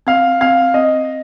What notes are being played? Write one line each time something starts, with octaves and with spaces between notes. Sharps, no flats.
C4 F5
C4 F5
C4 D#5